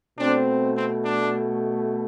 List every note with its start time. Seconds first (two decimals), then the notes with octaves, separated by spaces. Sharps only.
0.18 B2 A3 C4 D4
0.76 C4
1.04 D4